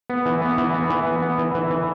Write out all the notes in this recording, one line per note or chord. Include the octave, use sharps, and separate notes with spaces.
B3
E3
B3
E3
B3
E3
B3
B3
E3
E3
E3